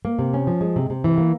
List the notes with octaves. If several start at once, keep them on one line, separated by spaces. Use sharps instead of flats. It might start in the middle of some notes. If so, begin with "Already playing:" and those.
A#3
C3
C#4
F3
G#3
C3
C3
E3
A#3